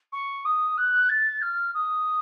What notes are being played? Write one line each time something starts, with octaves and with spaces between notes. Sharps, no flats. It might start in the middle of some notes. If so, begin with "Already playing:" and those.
C#6
D#6
F#6
A6
F6
D#6